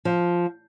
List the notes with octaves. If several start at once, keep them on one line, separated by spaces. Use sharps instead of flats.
F3